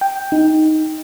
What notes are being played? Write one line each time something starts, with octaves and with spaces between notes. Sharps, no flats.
G5
D#4